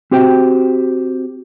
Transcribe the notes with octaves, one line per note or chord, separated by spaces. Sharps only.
C4 F#4 G4 C5 G5